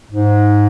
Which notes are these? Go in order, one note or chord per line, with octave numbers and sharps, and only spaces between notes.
G#2